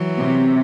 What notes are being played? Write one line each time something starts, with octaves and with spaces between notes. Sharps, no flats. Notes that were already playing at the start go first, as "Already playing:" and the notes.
Already playing: E3 F#3
C3